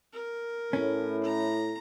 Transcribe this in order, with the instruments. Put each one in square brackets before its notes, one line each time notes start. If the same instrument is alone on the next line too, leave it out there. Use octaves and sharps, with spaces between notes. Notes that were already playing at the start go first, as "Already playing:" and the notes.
[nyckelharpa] A#4
[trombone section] A2 [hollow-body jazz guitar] C#4
[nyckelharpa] A#5